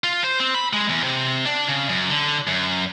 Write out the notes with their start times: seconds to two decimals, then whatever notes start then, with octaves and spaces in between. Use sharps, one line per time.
0.04 F4
0.24 C5
0.40 C4
0.54 B5
0.73 G#3
0.89 E2
1.04 C3
1.45 D4
1.68 C#3
1.89 F#2
2.10 D3
2.47 F#2